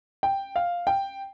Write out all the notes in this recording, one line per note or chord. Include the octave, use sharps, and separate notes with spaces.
G5
F5
G5